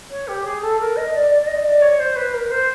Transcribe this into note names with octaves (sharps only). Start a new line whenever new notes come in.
C#5
G4
G#4
A4
A#4
D#5
D5
D5
D5
D#5
D5
C#5
C5
B4
A#4
C5